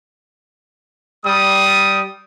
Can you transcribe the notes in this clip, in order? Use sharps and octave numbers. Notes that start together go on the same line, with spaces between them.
G3 D#6